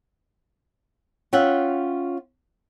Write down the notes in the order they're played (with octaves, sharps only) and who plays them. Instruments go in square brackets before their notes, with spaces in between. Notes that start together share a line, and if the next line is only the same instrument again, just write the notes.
[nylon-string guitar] C#4 F4 E5 F#5 G5